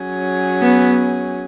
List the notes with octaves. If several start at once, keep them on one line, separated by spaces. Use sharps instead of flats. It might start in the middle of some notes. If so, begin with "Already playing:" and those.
Already playing: F#3 C#4 G#4
B3